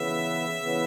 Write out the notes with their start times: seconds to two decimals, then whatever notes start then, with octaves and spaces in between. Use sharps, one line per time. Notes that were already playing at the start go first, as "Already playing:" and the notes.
Already playing: C#3 E3 B3 E5
0.59 C#3 E3 B3